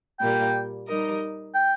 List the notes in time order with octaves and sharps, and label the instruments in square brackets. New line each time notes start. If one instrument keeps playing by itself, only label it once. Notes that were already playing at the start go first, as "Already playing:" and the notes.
[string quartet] A#2 G3 A#3 [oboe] G5
[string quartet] G3 D#4 A#4 D#5
[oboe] G5